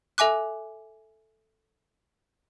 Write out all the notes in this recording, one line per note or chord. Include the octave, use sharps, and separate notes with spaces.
A4 E5 G#5 D6 F#6